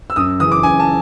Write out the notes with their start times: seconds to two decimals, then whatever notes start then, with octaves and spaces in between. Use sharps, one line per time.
0.10 E6
0.16 F#2 D#6
0.40 C#3 E3 D#6
0.52 D6
0.63 F#2 G#5
0.80 A5